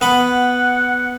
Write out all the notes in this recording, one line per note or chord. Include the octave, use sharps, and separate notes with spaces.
B3 F#5 B5